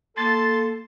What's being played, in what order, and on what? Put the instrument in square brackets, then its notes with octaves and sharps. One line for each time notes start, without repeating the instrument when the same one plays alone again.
[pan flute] A#3 [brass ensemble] A4 [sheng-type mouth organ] A5 C6 [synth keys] A6